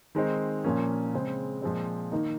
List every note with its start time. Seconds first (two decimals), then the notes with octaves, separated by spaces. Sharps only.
0.15 D#3 G#3 C4 D#4
0.64 A#2 F3 A#3 C#4
1.14 C#3 G#3 C4
1.62 A#2 F3 G#3 C4
2.11 D#3 A#3 D#4